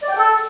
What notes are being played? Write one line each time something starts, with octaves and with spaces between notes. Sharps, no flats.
D5
G5
A4